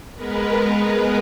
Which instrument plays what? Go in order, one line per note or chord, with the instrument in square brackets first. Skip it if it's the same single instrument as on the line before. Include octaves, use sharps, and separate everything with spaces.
[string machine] G#3 B3 A#4 B4